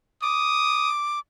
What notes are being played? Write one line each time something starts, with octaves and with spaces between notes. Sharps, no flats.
D6 D#6